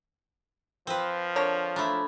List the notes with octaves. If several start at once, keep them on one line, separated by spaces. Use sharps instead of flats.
F3 C4 B4
D3 A#4 C#5
A3 D4 A#5 B5 G#6